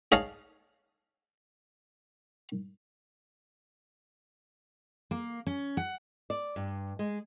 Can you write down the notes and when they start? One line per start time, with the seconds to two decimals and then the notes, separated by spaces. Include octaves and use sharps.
0.12 G#4 C#5 D#5 F5 A5
5.11 A#3
5.47 C#4
5.77 F#5
6.30 D5
6.56 G2
6.99 G#3